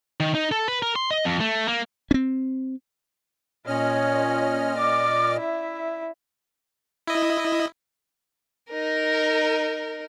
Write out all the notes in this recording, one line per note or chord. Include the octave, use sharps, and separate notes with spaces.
D#3
D#4
A4
B4
A#4
C6
D#5
F2
A3
A#3
C4 C#4
A#2 C#4 C#5 D#5 F6
D5 D6
E4 E5
E4 D#5
D#4 A#4